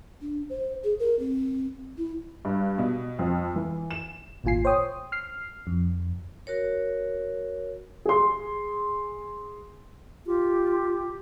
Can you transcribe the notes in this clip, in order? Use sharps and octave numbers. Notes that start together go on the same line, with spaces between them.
D4
C5
G#4
A#4
C4
E4
G2
B2
F2
E3
E7
G#1 D#2 A#2 F4 G#5 C7
C5 C#5 G5 D#6
F6 C7
F2
F#4 A#4 C#5
G#4 C6
F4 G4